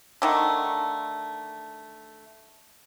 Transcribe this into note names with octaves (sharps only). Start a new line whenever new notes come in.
D3 D#3 A3